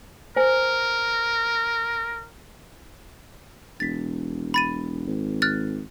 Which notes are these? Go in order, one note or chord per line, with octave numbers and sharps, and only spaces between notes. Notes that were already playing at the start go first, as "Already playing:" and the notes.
A#4 C5 G#5
E1 A6 B6
B5 A6 D#7
G#1
F6 F#6 A6